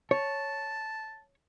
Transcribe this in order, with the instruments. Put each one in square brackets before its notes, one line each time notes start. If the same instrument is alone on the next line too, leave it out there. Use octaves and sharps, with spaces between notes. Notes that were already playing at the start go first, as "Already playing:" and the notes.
[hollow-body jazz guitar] C#5 [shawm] A5